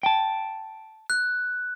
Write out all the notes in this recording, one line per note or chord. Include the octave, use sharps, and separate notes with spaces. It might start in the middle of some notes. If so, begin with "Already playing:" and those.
G5 A5
F#6